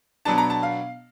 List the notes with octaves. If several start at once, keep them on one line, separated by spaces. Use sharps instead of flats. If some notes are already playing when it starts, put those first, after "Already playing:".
B2 F#3 B3 D4 A5
A#5
A5
F5